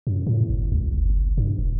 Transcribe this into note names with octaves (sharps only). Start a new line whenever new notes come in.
F#2
A2
G1
C#2
F#1
F#1
G2
E1